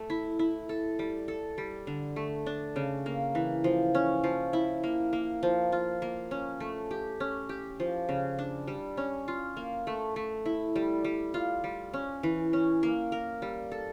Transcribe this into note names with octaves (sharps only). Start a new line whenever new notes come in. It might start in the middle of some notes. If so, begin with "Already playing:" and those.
Already playing: A3
E4
E4
A4
G3
A4
G3
D3
A3
D4
C#3
A#3
E3
F3
C#4
F3
E4
A#3
A#3
F3
F4
A#3
C#4
A3
G4
C#4
G4
F3
C#3
D4
G3
C#4
F4
A#3
A3
A3
E4
G3
G3
F4
G3
C#4
E3
C#4
A#3
A#4
G3
A4